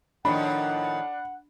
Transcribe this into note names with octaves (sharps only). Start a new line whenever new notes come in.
A2 D#3 F3 D4 F#5 B5